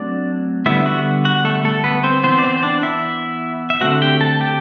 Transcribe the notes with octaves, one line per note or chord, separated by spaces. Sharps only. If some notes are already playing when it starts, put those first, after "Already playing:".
Already playing: F#3 A3 C4 D4 D5
D3 G3 B3 E4 E5
F#4 F#5
F#4 F#5
A3 A4
A3 A4
B3 B4
C4 C5
E3 B3 C4 C5
D5
C4 C5
C5
D4 D5
E4 E5
E5
D3 A3 C4 F#4 F#5
G4 G5
A4 A5
G4 G5